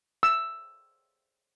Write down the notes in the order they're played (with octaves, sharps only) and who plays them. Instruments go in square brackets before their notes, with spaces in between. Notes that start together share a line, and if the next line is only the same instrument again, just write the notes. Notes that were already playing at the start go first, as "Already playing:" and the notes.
[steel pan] E6